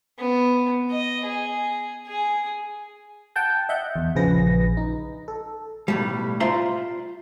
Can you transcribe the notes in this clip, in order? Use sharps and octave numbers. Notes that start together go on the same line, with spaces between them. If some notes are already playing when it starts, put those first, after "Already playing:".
B3
D#5
G#4
G#4
F#5 G5 A5 G6
D#5 E5 F#5 G6
E2
A#1 C#3 F3 G#4 B4 A#6
D#4
A4
B1 A2 G3
F4 C5 D5 E5 A#5 C6